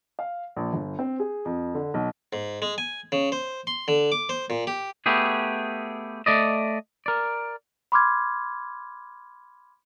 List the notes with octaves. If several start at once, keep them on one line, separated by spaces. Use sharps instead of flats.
F5
A#1
G1
C4
G#4
F2
D3
B1
G#2
G#3
G#5
C#3
C5
C6
D3
D6
C5
A#2
G4
A3 B3 G4 G#4
A3 D5 D#5
A#4 D5
B5 C6 D6 F6 G#6